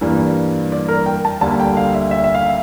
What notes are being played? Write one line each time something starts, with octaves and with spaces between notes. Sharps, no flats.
G2 E3 G3 A#3
D5
A#4
G5
A5
D2 D3 G3 A#3 A5
G5
F5
E5
E5
E5
F5